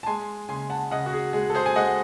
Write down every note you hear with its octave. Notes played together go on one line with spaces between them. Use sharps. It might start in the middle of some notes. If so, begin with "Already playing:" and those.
A5
G#3 G#5 C6
C#3 G#5 C6
F#5 A5
C#3 D#5 F#5
F#4
G#4
G#3 G#4
A4
G#4 C5
G#5
G#3 D#5 F#5